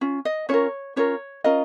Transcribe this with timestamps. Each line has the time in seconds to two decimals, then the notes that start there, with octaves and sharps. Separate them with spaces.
0.01 C#4 F4
0.25 D#5
0.49 C#4 F4 A#4 C#5
0.96 C#4 F4 A#4 C#5
1.44 C#4 F4 A#4 D#5